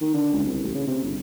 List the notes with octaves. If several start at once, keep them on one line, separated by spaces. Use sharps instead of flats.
D#3
D3
C#2
C2
A1
C#3
C3
G1